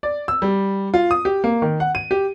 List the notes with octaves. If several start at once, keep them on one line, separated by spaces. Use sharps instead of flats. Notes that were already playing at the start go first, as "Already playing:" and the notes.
D5
E6
G3
F4
D#6
G4
A#3
D#3
F#5
D#7
G4